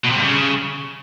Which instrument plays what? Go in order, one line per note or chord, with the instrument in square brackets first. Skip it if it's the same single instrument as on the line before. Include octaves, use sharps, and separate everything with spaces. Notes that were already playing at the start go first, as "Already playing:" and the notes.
[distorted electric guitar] B2
C3
G2
C#3